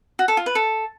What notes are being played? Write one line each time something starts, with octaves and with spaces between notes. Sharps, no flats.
F#4
A4
F4
B4
A4